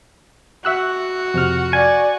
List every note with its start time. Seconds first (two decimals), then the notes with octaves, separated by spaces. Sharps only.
0.65 F#4 E5 E6 F#6
1.34 F2 C3 F6
1.73 D5 G#5